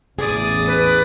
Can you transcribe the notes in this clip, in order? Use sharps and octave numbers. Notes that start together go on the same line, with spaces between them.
A1 E2 G#4 D5 D#6
B4